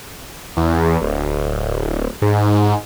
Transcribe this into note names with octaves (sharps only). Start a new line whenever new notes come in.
E2
D1
G#2